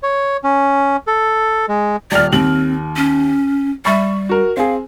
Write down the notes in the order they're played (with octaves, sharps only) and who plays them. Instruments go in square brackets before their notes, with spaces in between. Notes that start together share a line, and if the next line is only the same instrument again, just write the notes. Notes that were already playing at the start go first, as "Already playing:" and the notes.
[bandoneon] C#5
C#4
A4
G#3
[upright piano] D#1 F6 [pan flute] D5
[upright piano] D#2 F#7 [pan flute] C4
[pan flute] C#4
[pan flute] G3 [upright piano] E5 B5 C#6
[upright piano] F#4 A#4
[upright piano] C4 G#4 [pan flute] F5